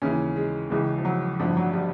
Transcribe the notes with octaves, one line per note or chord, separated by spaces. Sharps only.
D#2 C#3 E3 C#4
G#3
C#2 C#3 E3
F3
F#3
A1 G2 D3 F3
F#3
G3